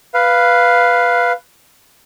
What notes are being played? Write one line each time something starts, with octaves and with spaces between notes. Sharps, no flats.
B4 F5